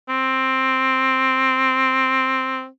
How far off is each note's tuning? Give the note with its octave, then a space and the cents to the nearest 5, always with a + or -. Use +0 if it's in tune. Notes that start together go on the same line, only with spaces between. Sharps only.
C4 +5